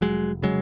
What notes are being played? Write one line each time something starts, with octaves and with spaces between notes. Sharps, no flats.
F1 F#3 G#3
C#3 F#3 G#3